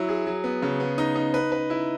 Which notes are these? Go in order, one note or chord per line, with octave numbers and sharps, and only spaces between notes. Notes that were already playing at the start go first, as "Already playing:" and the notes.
Already playing: F#3 E4
G#4
F#3
B3
C#3
B3
D#4
D#4
B4
B4
E4